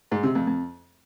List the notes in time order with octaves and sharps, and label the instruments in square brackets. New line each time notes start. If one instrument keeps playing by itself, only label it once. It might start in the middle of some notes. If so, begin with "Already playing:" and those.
[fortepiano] G#2
C3
F2
F2